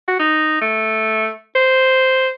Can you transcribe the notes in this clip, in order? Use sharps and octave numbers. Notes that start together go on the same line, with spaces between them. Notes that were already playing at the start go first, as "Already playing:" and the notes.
F#4
D#4
A3
C5